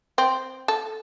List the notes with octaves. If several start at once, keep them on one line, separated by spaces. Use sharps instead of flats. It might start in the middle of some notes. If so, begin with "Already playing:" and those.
C4
A4